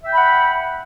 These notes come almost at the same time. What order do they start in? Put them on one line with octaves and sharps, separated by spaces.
E5 G5 B5 F#5